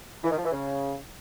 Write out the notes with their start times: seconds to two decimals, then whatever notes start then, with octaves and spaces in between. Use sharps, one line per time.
0.24 E3
0.31 D#3
0.38 F3
0.45 E3
0.52 C#3